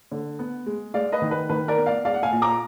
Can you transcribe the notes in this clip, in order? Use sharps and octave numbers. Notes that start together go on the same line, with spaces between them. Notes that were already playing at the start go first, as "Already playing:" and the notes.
D3
B3
G#3
G#3 D5 F5
B4 D#5
D#3
B4
D#3 B4
A#4 D5
B3
D5 F5
G#3 D5 F5
F#5
F5 G#5
A#2
A#5 D6